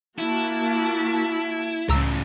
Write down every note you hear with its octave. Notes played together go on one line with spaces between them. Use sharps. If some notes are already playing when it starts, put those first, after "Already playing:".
A#3 E4 F#4 A5
C#2 A2 C#3 A#5 E6